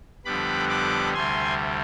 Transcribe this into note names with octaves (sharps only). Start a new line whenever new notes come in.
F2 D3 G3 B3 B5 D6
B5 D6
D2 C3 G3 G#5 C6